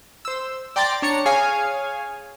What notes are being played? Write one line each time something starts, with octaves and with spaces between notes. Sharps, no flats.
C5 E6
D5 G5 A#5 C6 D6 A6
D4 C#5 A#5 C#7
G#4 C#5 F5 G#5